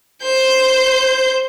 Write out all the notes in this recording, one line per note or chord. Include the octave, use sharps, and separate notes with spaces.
C5 G6